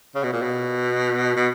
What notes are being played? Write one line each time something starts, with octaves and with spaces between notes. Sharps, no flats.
C#3
B2
A#2
B2
B2